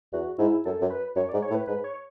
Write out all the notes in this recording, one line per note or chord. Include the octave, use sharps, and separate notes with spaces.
E2 F#4
G#2 E4
F#2 A4
F#2
B4
F#2 C#5
D5
G#2
C#5
A2
B4
G#2 B4
C#5